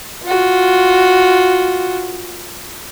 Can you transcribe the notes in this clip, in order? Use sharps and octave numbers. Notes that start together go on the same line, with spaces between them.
F4 F#4